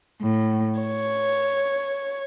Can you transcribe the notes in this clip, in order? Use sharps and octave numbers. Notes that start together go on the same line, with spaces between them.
A2
C#5